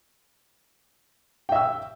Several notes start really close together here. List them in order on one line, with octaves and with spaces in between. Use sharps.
G5 E5 E6